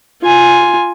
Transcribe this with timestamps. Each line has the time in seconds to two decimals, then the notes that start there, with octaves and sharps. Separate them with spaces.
0.23 F4 G#5